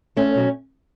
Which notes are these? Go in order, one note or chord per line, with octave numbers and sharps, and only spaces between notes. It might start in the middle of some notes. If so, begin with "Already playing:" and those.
E2 A3 C#4
B2 F#3